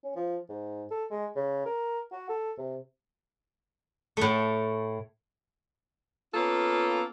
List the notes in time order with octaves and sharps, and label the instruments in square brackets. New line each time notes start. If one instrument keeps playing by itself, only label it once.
[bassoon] C#4
F3
G#2
A4
G#3
C#3
A#4
F#4
A4
C3
[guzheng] A2 A3
[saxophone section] A#3 B3 C#4 F4 A4